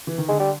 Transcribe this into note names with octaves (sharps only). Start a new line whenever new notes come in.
E3
D#3
D3 G#3
G3